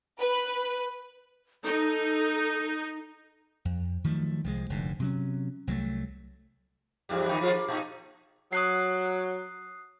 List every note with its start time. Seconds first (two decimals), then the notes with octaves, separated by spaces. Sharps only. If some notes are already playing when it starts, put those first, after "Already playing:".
0.19 B4
1.64 D#4 A4
3.65 F2
4.04 D#3 F3 F#3 A3
4.44 C2 F3 F#3 G#3
4.70 F1 G#2 D3
5.00 C3 F#3 C#4
5.67 C2 F#3 G#3 A3
7.09 E2 G#2 G3
7.29 E2 D#3 D#4
7.41 F3 G#3 F4
7.53 A#3
7.68 A#2 D#4
8.53 F#3 D#6 F#6 C7